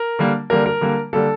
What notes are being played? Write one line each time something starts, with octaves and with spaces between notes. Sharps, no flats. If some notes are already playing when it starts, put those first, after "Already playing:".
Already playing: A#4
D3 G3 A#3
D3 G3 A#3 A#4
A#4
D3 G3 A#3
D3 G3 A#3 A4